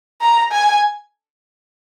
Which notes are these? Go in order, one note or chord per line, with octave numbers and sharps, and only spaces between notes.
A#5
G#5